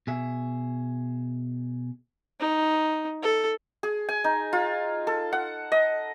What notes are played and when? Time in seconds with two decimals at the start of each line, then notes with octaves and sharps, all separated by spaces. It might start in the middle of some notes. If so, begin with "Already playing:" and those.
0.07 B2 G#4 E5
2.40 D#4
3.23 A4
3.83 G#4
4.09 G#5
4.24 D#4
4.53 F4
5.07 A4
5.33 F#5
5.72 D#5